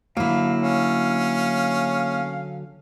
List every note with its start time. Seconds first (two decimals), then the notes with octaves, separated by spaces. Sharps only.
0.17 D3 F#3 A#3 E4 F5
0.62 C#4 F5